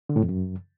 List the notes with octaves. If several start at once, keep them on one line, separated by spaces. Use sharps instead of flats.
D3
A2
F2
F#2